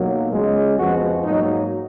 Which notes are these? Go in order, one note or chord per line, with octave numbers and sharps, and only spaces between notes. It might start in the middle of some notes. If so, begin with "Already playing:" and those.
Already playing: B1 B2 F#3 A#3
C#2 C#3 G#3
F2 F3 G#3 B3 F#4
G#2 F#3 A#3 D#4